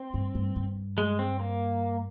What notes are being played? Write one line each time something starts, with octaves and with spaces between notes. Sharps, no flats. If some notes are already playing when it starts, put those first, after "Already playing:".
Already playing: C4
G2
G2
G2
G#3
C4
A#3